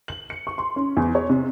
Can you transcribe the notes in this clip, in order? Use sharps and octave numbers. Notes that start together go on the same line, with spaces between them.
F#7
C#7
C#6
C6
C#4
E2
C#5
C3